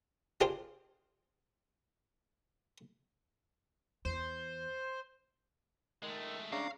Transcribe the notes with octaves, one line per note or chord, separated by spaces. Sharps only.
D4 F4 G4 G#4 C5
E2 C5
D#3 G#3 A3
C#3 C#4 D4 F5 A#5